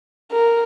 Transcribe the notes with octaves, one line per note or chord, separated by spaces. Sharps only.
A#4